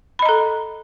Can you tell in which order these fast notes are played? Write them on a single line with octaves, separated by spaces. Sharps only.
B5 D#5 A#5 A4